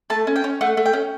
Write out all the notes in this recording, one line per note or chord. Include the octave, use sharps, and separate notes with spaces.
A3 A5
C#4
G5
C#4
A3 F#5
A3
G5
C#4